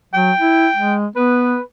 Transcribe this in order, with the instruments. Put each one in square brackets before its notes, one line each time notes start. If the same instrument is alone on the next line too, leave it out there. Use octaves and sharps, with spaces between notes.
[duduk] F#3 [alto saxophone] G5
[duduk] E4
G#3
[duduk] B3 [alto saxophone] B4